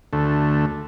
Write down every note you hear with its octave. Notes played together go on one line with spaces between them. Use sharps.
D2 A3